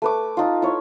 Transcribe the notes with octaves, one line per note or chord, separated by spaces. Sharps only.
A3 B4 D6
D#4 F4
E4 C#5